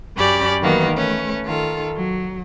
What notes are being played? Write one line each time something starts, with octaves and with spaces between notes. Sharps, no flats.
F#2 C#4 G4 D5 B5
D#3 E3 F#3 A#3 B3
A3 C#4 B4
D#3 F4 A4
F#3